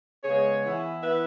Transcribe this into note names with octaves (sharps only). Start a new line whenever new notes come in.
C#3 G#3 B3 G#4 C#5
E3 B3 E4
E3 B3 E4 B4 E5